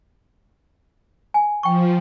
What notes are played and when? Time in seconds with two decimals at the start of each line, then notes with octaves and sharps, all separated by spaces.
1.34 G#5
1.63 F3 G5 C#6